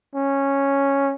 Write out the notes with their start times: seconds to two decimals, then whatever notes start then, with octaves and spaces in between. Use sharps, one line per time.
0.15 C#4